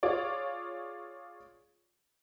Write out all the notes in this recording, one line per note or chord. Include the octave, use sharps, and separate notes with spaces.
F4 G#4 C#5 D5